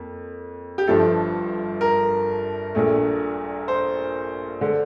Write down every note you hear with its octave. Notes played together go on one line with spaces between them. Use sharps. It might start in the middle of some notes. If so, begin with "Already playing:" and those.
Already playing: F2 A#3
G4
G1 G2 F3 A3 A4
A#4
A#1 A#2 A3
C5
D3